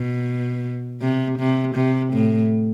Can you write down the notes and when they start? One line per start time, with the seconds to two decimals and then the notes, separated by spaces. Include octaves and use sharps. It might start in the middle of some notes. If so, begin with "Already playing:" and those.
Already playing: B2
1.02 C3
1.39 C3
1.75 C3
2.13 A2